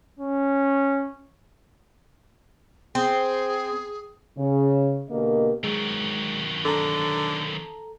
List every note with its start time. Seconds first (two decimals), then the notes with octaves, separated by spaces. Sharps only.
0.19 C#4
2.95 C4 G#4
4.38 C#3
5.10 B2 D3 A#3 G4 A#4 D#5
5.64 D#3 F#3 G#3
6.65 D3 A4 A5 A#5